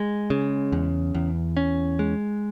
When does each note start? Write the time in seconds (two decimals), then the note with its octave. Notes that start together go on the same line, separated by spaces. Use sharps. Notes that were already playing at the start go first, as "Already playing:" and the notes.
Already playing: G#3
0.30 C#3
0.72 E2
1.14 E2
1.57 C#4
1.99 G#3